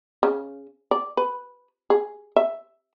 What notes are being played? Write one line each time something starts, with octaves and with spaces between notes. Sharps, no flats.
C#3
D5
B4
G#4
E5